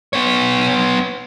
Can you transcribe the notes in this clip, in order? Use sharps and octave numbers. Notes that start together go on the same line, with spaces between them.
B3 C#5